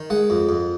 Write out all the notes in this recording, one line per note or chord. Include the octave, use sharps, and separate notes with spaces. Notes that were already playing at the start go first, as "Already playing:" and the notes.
Already playing: D#3
G#3 F#5
F2
F2